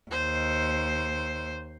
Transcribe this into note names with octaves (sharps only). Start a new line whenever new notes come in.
D#2 C5